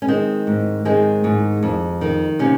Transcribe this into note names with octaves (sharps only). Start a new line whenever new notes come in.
C#4
D#3 G#3 C4
G#2
D#3 G#3 C4
G#2
F2
D#3
C3 A#3 C#4